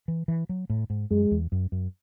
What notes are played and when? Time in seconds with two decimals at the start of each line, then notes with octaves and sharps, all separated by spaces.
0.08 E3
0.28 E3
0.49 F#3
0.70 A2
0.90 G#2
1.11 F#2 G#3
1.31 E2
1.52 F#2
1.72 F#2